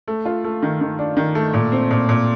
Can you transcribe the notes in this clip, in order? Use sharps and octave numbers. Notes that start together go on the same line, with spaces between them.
A3
F4
A3
D#3
D#3
D4
D#3
A3
A#2
C4
A#2
A#2